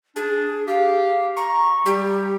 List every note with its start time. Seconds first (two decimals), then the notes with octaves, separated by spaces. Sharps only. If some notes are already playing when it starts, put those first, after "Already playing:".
0.16 D4 G#4
0.67 G4 F5
1.37 A#5 C#6
1.86 G3 G4